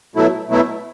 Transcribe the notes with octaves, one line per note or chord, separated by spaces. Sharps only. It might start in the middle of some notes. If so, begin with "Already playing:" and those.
B2 F#3 A3 E4
B2 F#3 A3 E4